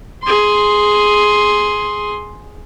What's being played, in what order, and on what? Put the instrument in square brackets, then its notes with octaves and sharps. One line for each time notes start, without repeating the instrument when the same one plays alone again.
[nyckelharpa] G#4 C6